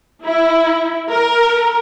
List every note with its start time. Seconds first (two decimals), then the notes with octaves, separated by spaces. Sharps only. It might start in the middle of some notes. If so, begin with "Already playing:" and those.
0.25 E4
1.11 A#4